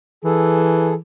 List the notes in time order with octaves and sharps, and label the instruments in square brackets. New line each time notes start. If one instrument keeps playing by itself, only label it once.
[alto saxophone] E3 [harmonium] G#4 A4